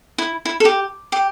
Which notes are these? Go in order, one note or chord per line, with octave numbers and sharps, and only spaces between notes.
E4
E4
A4
G4
G4